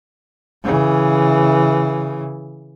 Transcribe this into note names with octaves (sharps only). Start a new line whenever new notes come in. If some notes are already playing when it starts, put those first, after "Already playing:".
C#3 E3